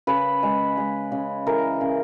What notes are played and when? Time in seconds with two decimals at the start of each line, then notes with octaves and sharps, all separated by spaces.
0.07 C#3 B4
0.43 G#3
0.77 G#3
1.12 C#3
1.47 E3 A#4
1.81 C#3